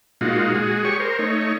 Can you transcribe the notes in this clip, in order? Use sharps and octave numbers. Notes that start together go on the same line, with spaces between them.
A#2 G#3 D#4 F4 F#4
G#3 F#4 G#4
G4 G#4 C#5 C#6
A#4 C5
A3 D#4 C#5